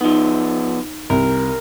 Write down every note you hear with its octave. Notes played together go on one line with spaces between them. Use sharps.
F3 B3 D#4
C2 A#4